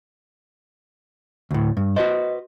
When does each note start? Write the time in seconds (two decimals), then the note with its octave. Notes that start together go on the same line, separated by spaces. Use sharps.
1.51 D2 A2
1.77 G2
1.96 F#4 B4 C5 D#5